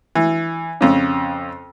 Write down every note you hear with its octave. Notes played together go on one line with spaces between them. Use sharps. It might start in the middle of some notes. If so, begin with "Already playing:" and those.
E3
F2 C#3